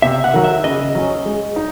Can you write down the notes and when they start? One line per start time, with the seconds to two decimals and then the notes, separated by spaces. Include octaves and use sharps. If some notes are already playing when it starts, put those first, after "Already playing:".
0.02 C3 E5
0.24 F#5
0.34 D#3 F#3
0.44 E5
0.64 C#3 D#5
0.95 F#3 C#4
1.26 G#3
1.56 D#4